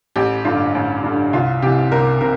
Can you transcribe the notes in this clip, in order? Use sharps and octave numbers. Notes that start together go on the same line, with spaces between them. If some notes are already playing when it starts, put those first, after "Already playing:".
A1 G4
G2 D3 F4
A1
G2 D3
C2 F4
C3 E3 G4
C2 A#4
C3 A#4